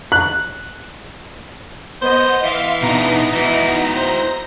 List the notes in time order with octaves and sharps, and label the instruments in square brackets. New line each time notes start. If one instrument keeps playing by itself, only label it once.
[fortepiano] F#6
[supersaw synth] B3 D#5 [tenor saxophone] C5
[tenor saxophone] E3 [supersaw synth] E5 F5 C6
[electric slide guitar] B2 D4 [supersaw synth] B3 D#4 A#5
[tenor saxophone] E3 [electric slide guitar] E4 F#4 D#5
[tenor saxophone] C5 [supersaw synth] A#5